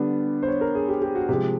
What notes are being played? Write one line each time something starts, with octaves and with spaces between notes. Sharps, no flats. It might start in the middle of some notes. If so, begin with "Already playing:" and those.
Already playing: D3 G3 B3 D4
C5
C#5
A#4
G#4
G4
G4
F#4
C3 F3 G#3 G4